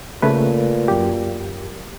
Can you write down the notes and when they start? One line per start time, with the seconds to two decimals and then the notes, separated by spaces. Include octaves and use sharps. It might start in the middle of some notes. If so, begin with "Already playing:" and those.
0.22 A#2 C#3 A3 B4
0.88 F#2 G4